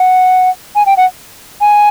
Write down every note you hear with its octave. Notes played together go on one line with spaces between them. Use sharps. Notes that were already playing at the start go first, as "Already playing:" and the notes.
Already playing: F#5
G#5
G5
F#5
G#5